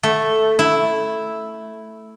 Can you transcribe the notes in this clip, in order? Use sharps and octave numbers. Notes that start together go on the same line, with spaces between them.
A3
E4